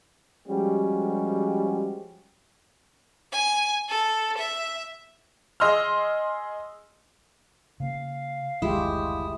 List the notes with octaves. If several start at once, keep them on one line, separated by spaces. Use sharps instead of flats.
F3 G3 G#3 C#4 F#4 G4
G#5
A4
E5
G#4 D#5 C6 E6 F6
C#3 A#3 F5
F#1 D2 D#3 G#3 E4 F4 G4 D#6